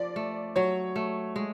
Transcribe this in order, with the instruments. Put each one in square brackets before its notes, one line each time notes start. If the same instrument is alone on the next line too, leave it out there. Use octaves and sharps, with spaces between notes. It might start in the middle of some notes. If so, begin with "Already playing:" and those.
Already playing: [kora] F3 [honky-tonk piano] D5
[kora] A3
[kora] F#3 [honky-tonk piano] C#5
[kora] A3
G#3